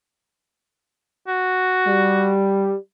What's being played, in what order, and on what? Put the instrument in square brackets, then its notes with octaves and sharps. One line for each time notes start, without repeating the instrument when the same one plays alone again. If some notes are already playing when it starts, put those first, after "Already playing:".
[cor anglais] F#4
[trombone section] G3